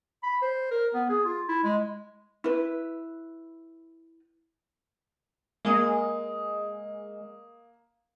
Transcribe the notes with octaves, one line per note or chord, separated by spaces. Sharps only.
B5
C5
A#4
B3
G#4
F4
E4
G#3
E4 B4
G#3 A#3 D#6